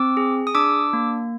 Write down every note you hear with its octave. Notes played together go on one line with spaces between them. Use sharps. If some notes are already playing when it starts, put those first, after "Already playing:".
Already playing: C4 D6 E6
G#4
D#6
D4 D6 E6
A#3